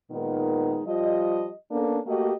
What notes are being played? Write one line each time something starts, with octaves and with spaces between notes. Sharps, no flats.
A#2 D#3 G#3 B3 D#4 A#4
F3 G3 D#5
A#3 B3 C#4 D4 A4
A3 A#3 F#4 G4 D#5